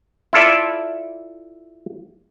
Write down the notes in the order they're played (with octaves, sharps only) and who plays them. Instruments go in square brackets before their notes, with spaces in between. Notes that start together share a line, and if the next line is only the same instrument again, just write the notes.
[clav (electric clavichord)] E4 F4 A4 D5 E5